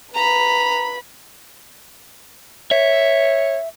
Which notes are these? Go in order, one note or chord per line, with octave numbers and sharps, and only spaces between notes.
B4 A#5 B5
C#5 E5